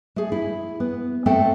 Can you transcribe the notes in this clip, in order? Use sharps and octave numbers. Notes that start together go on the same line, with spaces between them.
A3 G#4
E4
B3
A3 C4 A4 F#5 G5